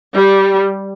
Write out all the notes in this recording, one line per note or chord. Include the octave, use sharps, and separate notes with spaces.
G3